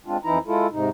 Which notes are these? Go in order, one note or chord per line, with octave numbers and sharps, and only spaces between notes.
G#3 C4 D4 F4
F2 E3 D#4 E4 A#5
G#3 E4 F4 A4
G#2 C3 D#4